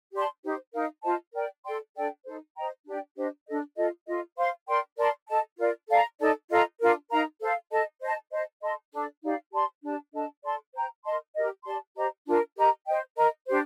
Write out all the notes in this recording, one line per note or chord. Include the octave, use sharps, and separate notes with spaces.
G4 D5 A5 C6
D#4 G4 C5
D#4 A#4 F5
F4 C5 D#5 A5
A#4 D5 G5
A4 D5 G5 C6
D4 A4 D5 G5
D#4 A4 C5
C5 D#5 G5 A#5
D4 G4 D5 G5
D4 G4 C5 D#5
D4 A4 D#5
F4 A4 D#5
F4 A4 D#5
C5 F5 C6
A#4 D5 G5 C6
A#4 D5 A5 C6
A4 D#5 A5
F4 A#4 D5
A4 D5 F5 A#5
D#4 A4 D5 A5
F4 A4 D#5 A#5
D4 F4 A#4
D#4 A#4 F5 A#5
A4 C5 F5
A4 D#5 A5
C5 D#5 A5
C5 D#5 A5
A4 D#5 A5 C6
D4 A4 D5
D#4 G4 D5 F5
G4 D5 A5 C6
D4 G4 D5 A5
D4 A4 D#5 A5
A4 D5 A5 C6
C5 G5 A#5
A#4 D#5 A5 C6
G4 A#4 D#5
G4 D5 A5 C6
G4 C5 D#5 A#5
D4 F4 A#4
G4 A#4 D#5 A#5
C5 D#5 G5
A#4 D#5 A#5
D4 G4 C5